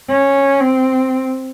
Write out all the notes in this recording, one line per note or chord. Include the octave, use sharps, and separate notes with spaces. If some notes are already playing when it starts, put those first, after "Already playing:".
C#4
C4